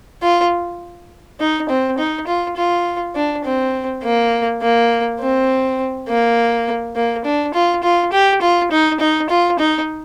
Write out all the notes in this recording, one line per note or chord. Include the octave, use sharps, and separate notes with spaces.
F4
D#4
C4
D#4
F4
F4
D4
C4
A#3
A#3
C4
A#3
A#3
D4
F4
F4
G4
F4
D#4
D#4
F4
D#4